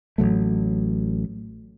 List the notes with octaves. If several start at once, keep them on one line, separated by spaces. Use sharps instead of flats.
A1 D#3 F#3 A3